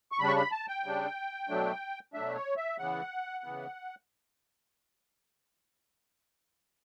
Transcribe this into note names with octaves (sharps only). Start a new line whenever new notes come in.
C#6
C#3 G3 D4 B5
C#6
B5
A5
G5
C#3 G3 D4
B2 F#3 A3 D4
B2 F#3 A3 D4 E5
C#5
E5
C#3 E3 B3 F#5
C#3 E3 B3